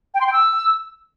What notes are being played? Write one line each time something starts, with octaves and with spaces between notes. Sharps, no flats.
G5
C6
G5
E6